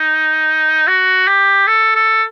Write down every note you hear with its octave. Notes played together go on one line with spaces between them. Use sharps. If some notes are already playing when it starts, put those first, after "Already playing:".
Already playing: D#4
F#4
G4
A4
A4